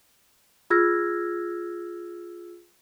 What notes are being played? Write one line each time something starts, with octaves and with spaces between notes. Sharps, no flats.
F4 G#4 E6 F6 G#6 A#6